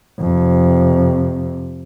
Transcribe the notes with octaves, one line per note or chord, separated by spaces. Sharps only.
F2 C3